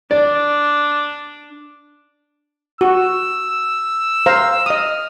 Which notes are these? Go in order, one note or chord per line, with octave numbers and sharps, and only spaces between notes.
D4 D5
F#4 E6
C5 F5 A#5
D#5 D#6 F6